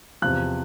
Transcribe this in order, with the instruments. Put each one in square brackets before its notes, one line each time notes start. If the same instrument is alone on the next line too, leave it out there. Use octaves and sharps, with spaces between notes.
[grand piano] E2 C3 F3 F#6